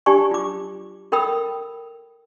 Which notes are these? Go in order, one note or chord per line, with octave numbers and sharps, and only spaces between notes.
D4 G4 D5 G#5 A5 C#6
F4 D6
A4 A#4 G5 B5 D#6 E6